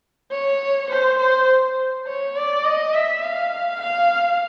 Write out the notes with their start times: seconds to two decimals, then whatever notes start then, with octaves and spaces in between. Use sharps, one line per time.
0.32 C#5
0.91 C5
1.20 C5
2.07 C#5
2.37 D5
2.65 D#5
2.94 E5
3.23 F5
3.81 F5